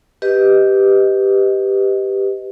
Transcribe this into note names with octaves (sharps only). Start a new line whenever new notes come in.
G4 B4 D#5